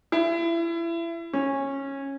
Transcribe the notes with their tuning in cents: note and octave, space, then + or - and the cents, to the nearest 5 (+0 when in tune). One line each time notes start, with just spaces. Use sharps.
E4 +30
C#4 -15